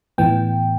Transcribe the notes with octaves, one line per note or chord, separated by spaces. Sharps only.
A2 E3 B3 G5